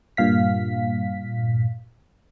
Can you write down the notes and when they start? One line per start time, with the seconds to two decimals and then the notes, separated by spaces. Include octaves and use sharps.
0.17 G2 A#2 F5 B6